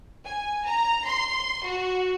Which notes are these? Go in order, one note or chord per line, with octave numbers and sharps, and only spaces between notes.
G#5
A#5
C6
F#4